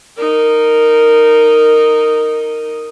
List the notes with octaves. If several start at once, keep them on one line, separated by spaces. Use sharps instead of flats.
D#4 A#4